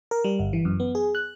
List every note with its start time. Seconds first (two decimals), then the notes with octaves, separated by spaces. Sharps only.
0.11 A#4
0.24 G3
0.39 G1
0.53 E3
0.65 F#2
0.80 B3
0.95 G#4
1.15 F#6